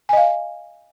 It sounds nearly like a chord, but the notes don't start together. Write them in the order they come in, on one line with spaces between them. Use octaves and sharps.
G#5 D#5 F5